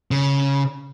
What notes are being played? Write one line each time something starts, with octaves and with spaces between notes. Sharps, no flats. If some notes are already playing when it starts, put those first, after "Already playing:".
C#3